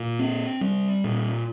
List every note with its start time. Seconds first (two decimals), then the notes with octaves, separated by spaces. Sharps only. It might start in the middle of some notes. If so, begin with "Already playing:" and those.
Already playing: A#2
0.19 C4
0.61 G3
1.04 A#2